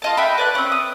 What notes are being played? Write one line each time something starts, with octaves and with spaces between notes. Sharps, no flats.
F4 D#5 A5
F#4 E5 G5 B5
B4 D5 F#6
C4 C#4
D#6